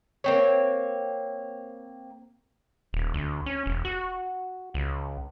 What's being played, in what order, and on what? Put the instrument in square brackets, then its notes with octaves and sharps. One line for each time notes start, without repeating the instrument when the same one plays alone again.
[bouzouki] A#3 C4 C#5
[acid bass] D#1
D2
C#4
E1
F#4
C#2